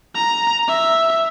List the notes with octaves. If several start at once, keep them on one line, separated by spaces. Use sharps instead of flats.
A#5
E5